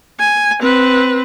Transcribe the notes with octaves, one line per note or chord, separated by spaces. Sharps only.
G#5
C4 B4